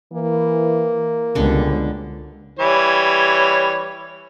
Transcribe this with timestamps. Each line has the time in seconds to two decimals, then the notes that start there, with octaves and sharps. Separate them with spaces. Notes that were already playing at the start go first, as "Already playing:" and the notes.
0.14 E3 A#3
1.35 C#2 B2 D3 G3 B3 D4
2.59 E3 G3 C#5